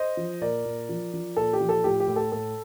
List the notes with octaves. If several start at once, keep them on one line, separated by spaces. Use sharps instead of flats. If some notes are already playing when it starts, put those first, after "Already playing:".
Already playing: C5 D#5
F3
A#2 A#4 D5
A#2
F3
F3
A#2 A4
G4
F3
A4
A2 G4
G4
A2
A4
A2 A4